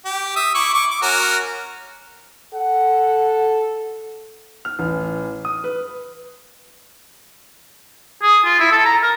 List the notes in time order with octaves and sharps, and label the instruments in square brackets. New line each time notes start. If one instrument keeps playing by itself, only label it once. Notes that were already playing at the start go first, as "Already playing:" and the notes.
[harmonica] G4
E5 D#6
E4 C#6 D6
C#6 D6
D6
C#4 F#4 A#4
[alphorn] A4 [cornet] F#5
[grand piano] F6
A1
D#6
B4
[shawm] G#4
F4
E4
A4
A#5
A#4